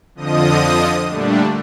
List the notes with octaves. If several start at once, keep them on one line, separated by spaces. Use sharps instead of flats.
F2 D3 F3 D#5 D#6
A#2 D3 G3 A3 D4